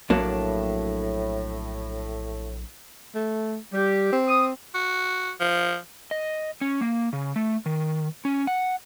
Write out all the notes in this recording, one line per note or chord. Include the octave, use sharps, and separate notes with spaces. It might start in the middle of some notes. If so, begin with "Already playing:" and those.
A#1 A2 F#3 A#3 D4
A3
G3 G4
C4
D#6
F#4
F3
D#5
C#4
A#3
C#3
A3
D#3
C#4
F#5